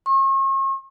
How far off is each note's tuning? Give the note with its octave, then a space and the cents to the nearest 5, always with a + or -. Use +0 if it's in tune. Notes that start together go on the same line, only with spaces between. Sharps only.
C#6 -40